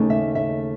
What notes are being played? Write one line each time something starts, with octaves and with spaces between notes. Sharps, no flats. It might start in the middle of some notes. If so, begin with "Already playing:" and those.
Already playing: D#2 C#3 A3 D#4
E5
E5